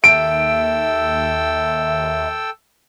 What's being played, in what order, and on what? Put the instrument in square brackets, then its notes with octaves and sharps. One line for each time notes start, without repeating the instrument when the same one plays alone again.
[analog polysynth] D#2 [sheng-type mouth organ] A4 G5 E6 [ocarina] E5 [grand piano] D7